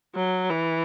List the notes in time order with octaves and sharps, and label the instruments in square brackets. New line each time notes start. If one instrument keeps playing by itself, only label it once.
[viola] F#3
E3